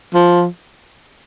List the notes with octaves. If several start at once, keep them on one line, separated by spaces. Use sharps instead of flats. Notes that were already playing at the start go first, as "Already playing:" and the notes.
F3